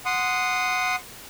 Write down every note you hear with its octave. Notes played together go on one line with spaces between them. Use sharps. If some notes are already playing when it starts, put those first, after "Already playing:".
F#5 C6 D#6